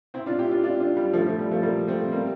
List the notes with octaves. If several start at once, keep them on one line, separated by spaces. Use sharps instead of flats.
C4 E4
D4 F4
E4 G4
D4 F4
D4 F4
D4 F4
G3
F3 A3
F3 A3
G3
F3 A3
G3 A#3
A3 C4
G3 A#3